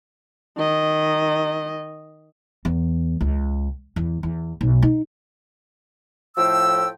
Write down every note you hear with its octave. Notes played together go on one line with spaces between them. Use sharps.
D#3 D#5
E2
C#2
E2
E2
B1
D#4
A2 F3 G5 E6